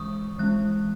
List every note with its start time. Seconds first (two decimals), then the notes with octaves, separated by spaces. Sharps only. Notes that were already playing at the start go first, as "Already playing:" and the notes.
Already playing: E3 G#3 C#4 C#6 D#6
0.38 E3 G#3 C#4 F#6